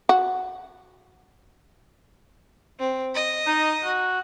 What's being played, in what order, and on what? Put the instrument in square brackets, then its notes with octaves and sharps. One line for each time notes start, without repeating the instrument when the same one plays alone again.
[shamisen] F#4
[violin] C4
D#5
[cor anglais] D#4
F#4